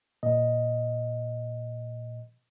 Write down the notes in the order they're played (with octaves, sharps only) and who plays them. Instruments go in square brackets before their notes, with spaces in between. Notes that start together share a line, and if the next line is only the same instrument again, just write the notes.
[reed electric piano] A#2 D#5